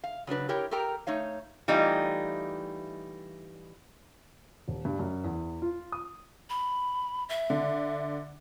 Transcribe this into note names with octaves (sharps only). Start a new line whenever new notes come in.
F5
C#3 F#3 D4 B4
E4 G4 A#4 C#5 G5
G4 A4 A#4 G5 A#5
A3 D#4 C#5 F5
E3 G3 A3 D#4 F4
D#1
G2
F#2
E2
F4
D#6
B5
E5
D3